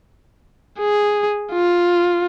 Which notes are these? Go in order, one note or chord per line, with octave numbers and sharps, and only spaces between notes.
G#4
F4